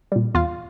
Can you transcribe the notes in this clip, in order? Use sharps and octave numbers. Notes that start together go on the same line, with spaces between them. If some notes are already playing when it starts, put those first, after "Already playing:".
A#2 G3
E2 F4 F5